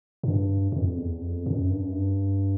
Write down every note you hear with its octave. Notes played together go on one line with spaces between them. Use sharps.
G2
F2
E2
F2
F#2
G2
F#2
G2